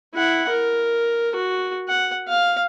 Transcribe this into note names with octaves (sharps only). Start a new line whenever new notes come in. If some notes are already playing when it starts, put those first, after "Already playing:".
E4 F#5
A#4
F#4
F#5
F5